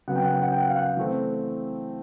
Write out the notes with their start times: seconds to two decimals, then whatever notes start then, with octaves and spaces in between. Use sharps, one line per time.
0.08 C#3 F#3 B3 F#5
0.16 G5
0.24 F#5
0.33 G5
0.42 F#5
0.52 G5
0.60 F#5
0.69 F5
0.77 F#5
0.97 E3 A3 C4